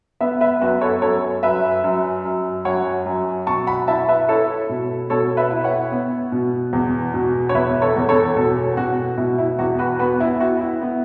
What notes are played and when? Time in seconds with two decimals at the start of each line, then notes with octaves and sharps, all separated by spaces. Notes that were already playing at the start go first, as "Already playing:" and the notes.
0.20 B3 B4 E5
0.41 B4 E5
0.61 F#2 F#4 B4
0.81 A4 C#5
1.02 F#2 A4 C#5
1.43 F#2 B4 E5
1.84 F#2
2.25 F#2
2.65 F#2 C#5 F#5
3.06 F#2
3.47 B2 A5 C#6
3.67 F#5 B5
3.88 E4 E5 A5
4.08 B4 E5
4.29 E4 A4 C#5
4.69 B2
5.10 B2 A4 C#5
5.37 B4 E5
5.51 E4
5.64 C#5 F#5
5.92 B3
6.32 B2
6.73 E2
7.14 B2
7.49 C#5
7.54 E2 B4 E5
7.82 A4 C#5
7.96 E2
8.09 A4 C#5
8.36 B2 A4 C#5
8.77 B2 F#4
9.17 B2 E4
9.38 E4
9.59 E2 F#4
9.79 F#4 B4
9.99 B3 F#4 B4
10.20 E4
10.40 E4 F#4
10.61 E4
10.81 B3